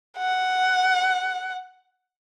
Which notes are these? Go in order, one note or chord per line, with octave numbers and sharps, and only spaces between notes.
F#5